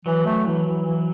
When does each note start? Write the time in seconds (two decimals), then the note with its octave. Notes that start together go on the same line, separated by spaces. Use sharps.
0.06 E3 F#3
0.26 A3
0.46 E3
0.66 E3
0.85 E3